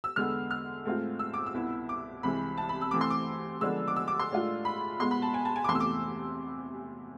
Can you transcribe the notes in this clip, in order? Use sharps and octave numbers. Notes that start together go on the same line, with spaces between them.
E6
E2 D3 G#3 B3 F6
F6
A2 G#3 C4 F4
E6
D6
E6
C2 B2 B3 E4
D6
C2 C3 E3 G#3 B5
A5
B5
E6
C3 E3 A3 C4 D6
C6
D6
D3 F3 G#3 B3 D4 E6
D6
E6
D6
C6
A2 G#3 D4 F4
B5
B2 G#3 B3 C6
B5
A5
G#5
A5
G#5
D6
E2 C3 E3 A3 C6
E6
D6